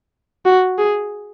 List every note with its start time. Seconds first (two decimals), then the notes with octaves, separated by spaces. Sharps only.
0.45 F#4
0.78 G#4